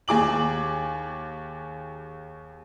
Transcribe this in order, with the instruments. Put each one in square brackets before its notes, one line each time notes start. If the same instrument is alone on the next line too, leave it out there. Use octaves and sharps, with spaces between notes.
[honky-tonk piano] D#2 G#4 D6 F#7